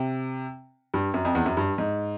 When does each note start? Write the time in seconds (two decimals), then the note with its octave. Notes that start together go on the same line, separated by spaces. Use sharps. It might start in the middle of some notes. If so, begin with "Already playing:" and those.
Already playing: C3
0.94 G2
1.14 F#2
1.25 F2
1.35 E2
1.46 F#2
1.57 G2
1.78 G#2